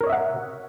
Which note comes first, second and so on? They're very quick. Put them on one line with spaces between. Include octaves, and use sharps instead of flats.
A#4 C#5 D#5 E5 F#5